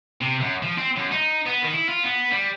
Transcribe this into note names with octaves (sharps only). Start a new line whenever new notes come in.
C3
F#2
F3
C4
F#2
D#4
B3
D#3
E4
F4
B3
G3